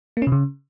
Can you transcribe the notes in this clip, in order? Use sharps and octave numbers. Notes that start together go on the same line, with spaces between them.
A#3
C#4
C3
C#3